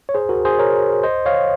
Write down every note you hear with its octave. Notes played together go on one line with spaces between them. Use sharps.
C#5
G#4 C5
F#4 A#4
G#4 C5
A#4 C#5
C5 D#5
C#5 F5